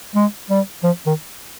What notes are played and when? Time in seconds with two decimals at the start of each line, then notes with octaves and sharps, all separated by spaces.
0.16 G#3
0.50 G3
0.84 F3
1.06 D#3